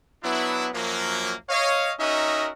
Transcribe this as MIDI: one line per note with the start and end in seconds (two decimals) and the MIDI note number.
0.24 0.69 54
0.24 0.69 59
0.24 0.69 62
0.24 0.69 64
0.74 1.34 42
0.74 1.34 53
0.74 1.34 54
0.74 1.34 58
1.50 1.93 73
1.50 1.93 75
1.50 1.93 77
2.00 2.51 61
2.00 2.51 63
2.00 2.51 66
2.00 2.51 70
2.00 2.51 75
2.00 2.51 76